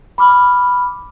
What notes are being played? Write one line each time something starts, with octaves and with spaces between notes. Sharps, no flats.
B5 D6 F6